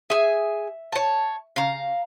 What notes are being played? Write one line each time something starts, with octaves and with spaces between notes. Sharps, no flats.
G#4 E5 G#5
C#5 A5
C#3 F5 A#5